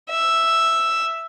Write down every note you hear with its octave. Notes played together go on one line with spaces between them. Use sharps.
E5